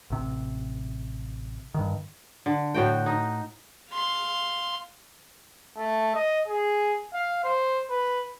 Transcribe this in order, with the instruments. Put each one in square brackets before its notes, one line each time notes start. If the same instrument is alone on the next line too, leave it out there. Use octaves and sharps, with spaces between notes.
[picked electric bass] A1 C3
G2 D#3
[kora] D3
A2 F#4 G5
D#4
[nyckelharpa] F5 C6
[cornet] A3
D#5
G#4
F5
C5
B4